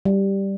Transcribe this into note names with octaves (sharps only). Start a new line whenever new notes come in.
G3